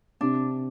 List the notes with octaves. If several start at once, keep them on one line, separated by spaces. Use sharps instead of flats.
C3 D4